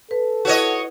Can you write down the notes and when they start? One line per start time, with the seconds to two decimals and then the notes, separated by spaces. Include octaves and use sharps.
0.11 A4 B4
0.45 E4 F#4 B4 C#5 D#5